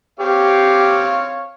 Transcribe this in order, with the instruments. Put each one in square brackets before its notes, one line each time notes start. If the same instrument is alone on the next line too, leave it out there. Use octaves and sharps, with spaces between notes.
[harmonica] C4 C#5 F5 [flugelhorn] G4